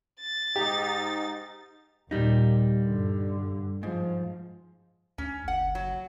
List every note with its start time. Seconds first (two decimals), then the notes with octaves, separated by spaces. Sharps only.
0.20 A6
0.56 G#2 D#4 G4
2.11 D#2 A#2 G3 D#4
2.83 G2 D3
3.83 G#2 F3
5.18 D2 C#4
5.48 F#1 F#5
5.75 F#3